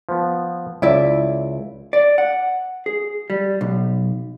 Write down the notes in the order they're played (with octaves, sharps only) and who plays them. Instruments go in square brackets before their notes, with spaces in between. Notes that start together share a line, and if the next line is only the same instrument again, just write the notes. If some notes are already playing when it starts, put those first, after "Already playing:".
[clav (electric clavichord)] F3 B3
[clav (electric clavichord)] C#2 [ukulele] E4 D5 E5
[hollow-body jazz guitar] D5
F#5
G#4
G3
B1